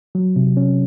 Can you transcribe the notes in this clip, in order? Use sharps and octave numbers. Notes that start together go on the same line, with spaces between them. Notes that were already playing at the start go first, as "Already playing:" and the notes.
F#3
C3
C#4